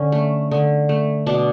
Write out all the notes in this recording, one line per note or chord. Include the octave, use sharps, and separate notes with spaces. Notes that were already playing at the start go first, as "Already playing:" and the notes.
Already playing: D3 C#4
A3
D3
A3
B2 D4